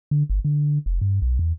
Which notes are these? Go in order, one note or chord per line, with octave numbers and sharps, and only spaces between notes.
D3
G1
D3
F1
G2
B1
E2